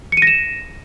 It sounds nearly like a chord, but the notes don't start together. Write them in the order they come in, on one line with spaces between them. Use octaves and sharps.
C#7 D#7 A#6 E7